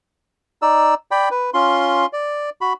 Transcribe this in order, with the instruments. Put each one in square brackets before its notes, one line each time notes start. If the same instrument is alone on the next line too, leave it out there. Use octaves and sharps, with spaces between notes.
[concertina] D#4 D5 E6
D5 G5 B5
B4
C#4 F4 C6
D5
F#4 B5